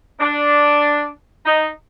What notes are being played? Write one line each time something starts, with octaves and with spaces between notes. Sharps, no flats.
D4
D#4